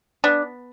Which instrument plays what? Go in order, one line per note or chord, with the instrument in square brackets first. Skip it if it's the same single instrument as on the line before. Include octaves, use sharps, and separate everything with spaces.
[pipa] B3 D4